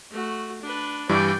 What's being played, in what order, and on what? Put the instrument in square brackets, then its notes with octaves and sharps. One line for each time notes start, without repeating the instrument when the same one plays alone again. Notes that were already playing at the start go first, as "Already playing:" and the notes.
[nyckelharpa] A3 F#4
D4 B4
[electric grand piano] G2 E3 G3 [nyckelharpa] D5 G5